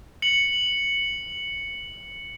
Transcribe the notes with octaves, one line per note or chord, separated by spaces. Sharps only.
C#7 F#7